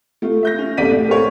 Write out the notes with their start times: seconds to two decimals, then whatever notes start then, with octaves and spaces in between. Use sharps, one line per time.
0.22 A3 F4
0.43 E5 G6 A#6
0.59 C#4
0.77 F#1 C2 A4 D5 B6 D#7
0.92 A2
1.08 A#4 C5 C#5